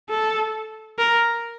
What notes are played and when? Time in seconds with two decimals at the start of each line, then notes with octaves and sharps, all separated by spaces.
0.10 A4
0.99 A#4